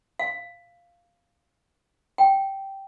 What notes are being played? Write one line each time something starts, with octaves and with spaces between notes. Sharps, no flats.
F5
G5